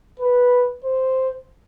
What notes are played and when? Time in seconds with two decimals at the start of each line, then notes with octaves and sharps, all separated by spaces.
0.20 B4
0.84 C5